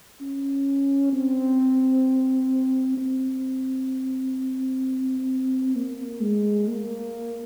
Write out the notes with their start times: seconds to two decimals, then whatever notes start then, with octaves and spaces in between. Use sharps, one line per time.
0.21 C#4
1.13 C4
2.97 C4
5.75 A#3
6.21 G#3
6.68 A#3